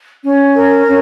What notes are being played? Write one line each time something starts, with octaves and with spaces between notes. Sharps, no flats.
C#4
A#4
C#4